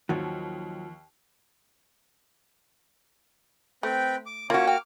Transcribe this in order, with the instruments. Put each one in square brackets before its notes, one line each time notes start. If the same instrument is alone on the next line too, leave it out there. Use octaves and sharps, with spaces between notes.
[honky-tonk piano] D#2 [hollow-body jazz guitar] F3 F#3
[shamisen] A3 [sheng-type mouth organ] C4 B4 G5
[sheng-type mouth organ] D6
[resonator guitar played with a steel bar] A#3 F#4 [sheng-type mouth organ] C#4 C#5 D6 [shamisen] F4
[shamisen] G5 [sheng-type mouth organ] D6 F6